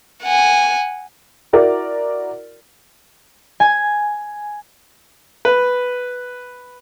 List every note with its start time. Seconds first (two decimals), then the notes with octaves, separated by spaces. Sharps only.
0.24 F#5 G#5
1.53 E4 F#4 A#4 D5
3.60 G#5
5.45 B4